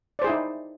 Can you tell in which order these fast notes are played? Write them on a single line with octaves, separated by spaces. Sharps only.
D5 C5 G#4 E4 D#4